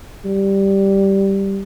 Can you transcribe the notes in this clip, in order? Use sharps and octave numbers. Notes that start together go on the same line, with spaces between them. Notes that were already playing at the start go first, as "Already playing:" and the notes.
G3